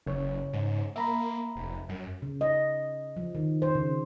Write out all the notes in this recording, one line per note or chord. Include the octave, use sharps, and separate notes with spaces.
F#1 C#3 C#5
G#2
A#3 E5 A#5 B5
F1
F#2
C#3
D#5
F3
D#3
C5
C#3